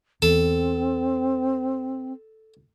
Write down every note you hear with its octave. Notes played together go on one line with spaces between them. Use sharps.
E2 C4 A4